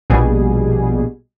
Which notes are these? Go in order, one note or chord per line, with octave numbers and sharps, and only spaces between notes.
A#1 B2 G3 G#4